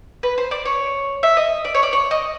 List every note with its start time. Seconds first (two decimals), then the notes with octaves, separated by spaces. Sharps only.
0.23 B4
0.38 C5
0.51 D5
0.65 C#5
1.23 E5
1.37 D#5
1.65 D5
1.74 C#5
1.83 D5
1.93 C#5
2.11 D#5